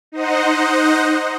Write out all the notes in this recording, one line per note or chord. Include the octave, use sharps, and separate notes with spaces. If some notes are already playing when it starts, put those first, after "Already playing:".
D#4 C5 D#5 F#5